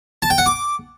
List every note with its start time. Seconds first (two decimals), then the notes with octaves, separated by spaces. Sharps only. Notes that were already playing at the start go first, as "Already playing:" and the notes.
0.22 A5
0.30 G5
0.38 F#5
0.46 D6